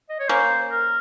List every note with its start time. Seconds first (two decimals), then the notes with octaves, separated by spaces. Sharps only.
0.09 D#5
0.19 C#5
0.29 A#3 C#4 C5
0.70 A#4